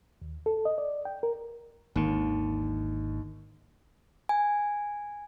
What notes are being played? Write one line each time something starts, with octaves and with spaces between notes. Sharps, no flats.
D#2
A4
D#5
D5
G5
A#4
G#1 D#2 D3
G#5